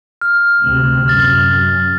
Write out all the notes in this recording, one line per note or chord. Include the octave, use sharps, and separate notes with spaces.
F6
D2 C3
F#2 F6 A6